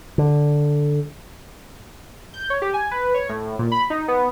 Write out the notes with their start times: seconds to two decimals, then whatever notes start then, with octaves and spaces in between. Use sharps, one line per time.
0.18 D3
2.34 G6
2.50 C#5
2.62 G4
2.74 G#5
2.91 B4
3.14 C#5
3.29 A2
3.59 A#2
3.72 B5
3.90 D#4
4.08 B3